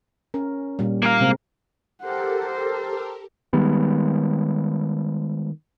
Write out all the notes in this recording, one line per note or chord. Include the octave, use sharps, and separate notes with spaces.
C#4 A#4
A#2 G3
A#3 A#4 F5
C3 G#3 C4
G4 A4 A#4 C5 F#5
C5
D#3 G3 G#3 B3